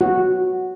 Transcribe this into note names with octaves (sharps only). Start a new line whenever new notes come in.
F#4